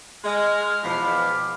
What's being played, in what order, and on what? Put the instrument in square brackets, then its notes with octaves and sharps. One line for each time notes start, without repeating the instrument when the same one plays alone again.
[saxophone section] G#3 [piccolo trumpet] F6
[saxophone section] E2 F3 [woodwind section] B2 B5 D6